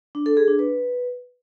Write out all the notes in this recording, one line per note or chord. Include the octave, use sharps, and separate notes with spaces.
D4
A4
G#4
D4
B4